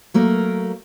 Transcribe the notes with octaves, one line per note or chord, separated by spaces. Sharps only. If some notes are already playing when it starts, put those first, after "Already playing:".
F#3 A3 A#3 A#4